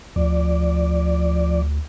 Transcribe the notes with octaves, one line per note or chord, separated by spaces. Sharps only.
D2 F3 D5